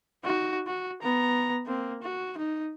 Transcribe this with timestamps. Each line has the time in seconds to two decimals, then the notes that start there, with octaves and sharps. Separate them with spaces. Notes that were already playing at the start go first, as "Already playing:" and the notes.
0.25 D#4 F#4
0.67 F#4
1.03 B3 A#5
1.66 A#3 C4
2.03 F#4
2.38 D#4